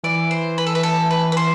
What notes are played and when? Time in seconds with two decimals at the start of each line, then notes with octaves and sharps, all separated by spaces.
0.04 E3 D5
0.31 C5
0.58 B4
0.67 A4
0.75 B4
0.83 A4
1.11 B4
1.32 B4
1.37 C5